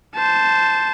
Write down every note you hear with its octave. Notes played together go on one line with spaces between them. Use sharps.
C5 A5